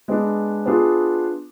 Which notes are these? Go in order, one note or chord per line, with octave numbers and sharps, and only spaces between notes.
G#3 B3 D4
B3 D4 F4 G#4